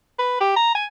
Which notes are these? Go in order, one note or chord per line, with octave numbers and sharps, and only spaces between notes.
B4
G4
A#5
G#5